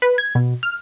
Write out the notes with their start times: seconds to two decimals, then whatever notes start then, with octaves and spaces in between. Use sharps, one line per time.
0.02 B4
0.18 G#6
0.35 B2
0.63 F6